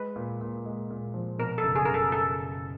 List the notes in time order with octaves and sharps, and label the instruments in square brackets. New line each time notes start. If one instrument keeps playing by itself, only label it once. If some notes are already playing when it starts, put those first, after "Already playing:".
Already playing: [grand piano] G#3 [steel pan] B4
[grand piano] A#2
A#2
G#3
A#2
F3
[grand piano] B2 [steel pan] A#4
[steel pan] A4
[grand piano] F#1
[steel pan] G#4
[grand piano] F#1 [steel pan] A#4
[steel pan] A4
A4